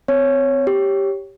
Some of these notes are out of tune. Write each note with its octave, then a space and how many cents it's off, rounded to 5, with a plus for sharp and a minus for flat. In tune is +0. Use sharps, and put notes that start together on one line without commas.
C4 -25 C#5 +0
G4 +0 C#5 +0